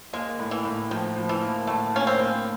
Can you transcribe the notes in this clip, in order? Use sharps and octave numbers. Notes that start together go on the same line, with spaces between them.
G#3 A#3
A2
E3
A2
D#3 F3
F3
E3
A#3
A2 A3
A#3 C#4
C4
A#3